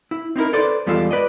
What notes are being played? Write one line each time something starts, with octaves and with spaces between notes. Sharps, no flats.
E4
C4 D#4 E4 A#4
A4 B4 C5 D5
E2 G3 G#3 F4 A4 F5
B4 D5 D#5